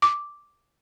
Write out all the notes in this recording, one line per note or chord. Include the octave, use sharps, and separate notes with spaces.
D6